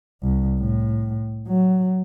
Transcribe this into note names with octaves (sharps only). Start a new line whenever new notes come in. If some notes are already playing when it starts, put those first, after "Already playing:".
C2
A2
F#3